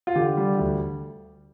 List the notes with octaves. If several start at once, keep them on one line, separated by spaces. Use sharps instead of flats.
F4
D3 G4
G3
D2